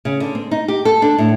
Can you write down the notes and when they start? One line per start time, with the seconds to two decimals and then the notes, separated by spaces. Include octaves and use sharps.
0.05 C#3
0.20 D3
0.35 C4
0.51 D#4
0.68 G4
0.85 A4
1.02 D4
1.18 A2